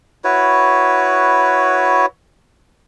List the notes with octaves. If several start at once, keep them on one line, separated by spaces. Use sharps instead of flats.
E4 F#4 B4 C#5